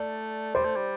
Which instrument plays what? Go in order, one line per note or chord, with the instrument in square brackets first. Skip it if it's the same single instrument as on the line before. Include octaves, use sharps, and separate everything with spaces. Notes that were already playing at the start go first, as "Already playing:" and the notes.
Already playing: [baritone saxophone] A3 [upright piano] D5
[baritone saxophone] G3 [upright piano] C5
[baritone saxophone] A3
G3